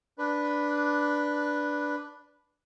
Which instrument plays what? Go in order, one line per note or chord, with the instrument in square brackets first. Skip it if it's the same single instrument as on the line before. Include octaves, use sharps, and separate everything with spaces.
[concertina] D4 B4